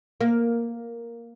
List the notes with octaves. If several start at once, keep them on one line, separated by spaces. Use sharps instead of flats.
A#3